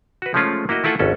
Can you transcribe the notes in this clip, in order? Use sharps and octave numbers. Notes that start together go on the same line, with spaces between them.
F#4 B4
F3 G#3 A3 C#4 F4 G#4
A#3 E4 F#4 D#5
A3 E4 F4 A4 F#5 G#5
G#1 D#2 C#4 A4